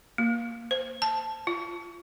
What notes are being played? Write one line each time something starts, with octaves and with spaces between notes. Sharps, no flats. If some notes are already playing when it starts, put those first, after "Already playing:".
A#3
C5
A5
F4